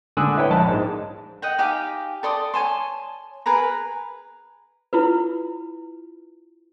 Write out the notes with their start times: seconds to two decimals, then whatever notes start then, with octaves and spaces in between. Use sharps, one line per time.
0.17 D3 G#5 D#6 E6 F#6
0.37 E4 B4 C#5 G5
0.50 A#1 A5 F#6
0.68 G#2 G#3
1.42 D#5 F#5 G5
1.58 D#4 G4 G#4 F5
2.23 A4 D5 C6 D#6
2.54 C#5 G#5 A5 C6
3.46 G#4 A#4 B4 A#5
4.93 E4 F4 B4